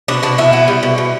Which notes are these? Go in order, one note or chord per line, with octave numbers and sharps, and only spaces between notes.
B2 D4
B2 D4
B2 E4
B3
G3
B2
B2